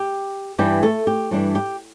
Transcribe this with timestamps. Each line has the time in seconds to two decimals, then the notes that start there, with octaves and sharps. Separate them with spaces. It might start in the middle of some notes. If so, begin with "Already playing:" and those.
Already playing: G4
0.58 G2 E3 G3 D4 G4
0.83 A3 A4
1.07 G4
1.31 G2 E3 G3 D4
1.55 G4